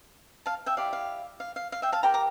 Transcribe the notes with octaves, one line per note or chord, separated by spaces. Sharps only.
F5 A5
E5 G5
E4 G4 D5 F5
F5
F5
F5
F5
E5 G5
F5 A5
G4 A#4 D5 G5 A#5
A#5 D6